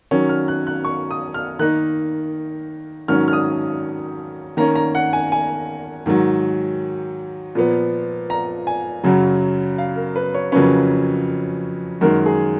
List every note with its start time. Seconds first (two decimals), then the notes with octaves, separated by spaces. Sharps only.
0.11 D#3 F#3 C#4
0.29 F6
0.48 F#6
0.67 F#6
0.85 C#6
1.11 D#6
1.34 F6
1.59 D#3 A#3 D#4 F#6
3.08 G#2 D#3 F#3 C#4 F6
3.28 F6
3.33 D#6
4.57 D#3 A#3 C#4 A#5
4.76 A#5
4.95 F#5
5.13 G#5
5.32 G#5
6.06 G#2 D#3 F#3
7.55 A#2 F3 B3
8.30 A#5
8.67 G#5
9.04 F#2 C#3 F#3
9.78 F5
9.96 A#4
10.16 B4
10.34 C#5
10.52 F2 C#3 F#3 A#3 C#4 B4
12.01 F#2 D#3 G#3 A#4
12.26 G#4